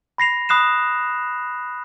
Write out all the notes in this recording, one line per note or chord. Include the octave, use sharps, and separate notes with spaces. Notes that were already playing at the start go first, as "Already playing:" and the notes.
B5 A#6 C7 F7
B5 D#6 F#6 C7 E7